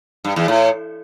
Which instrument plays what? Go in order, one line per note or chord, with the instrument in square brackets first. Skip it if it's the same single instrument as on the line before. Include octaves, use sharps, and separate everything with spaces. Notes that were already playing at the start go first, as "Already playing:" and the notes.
[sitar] G2
E2
A2